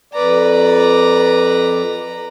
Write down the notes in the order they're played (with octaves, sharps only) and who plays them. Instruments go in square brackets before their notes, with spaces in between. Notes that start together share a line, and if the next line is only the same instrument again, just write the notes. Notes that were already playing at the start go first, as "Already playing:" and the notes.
[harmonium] F2 D5 [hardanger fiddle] B4 A#5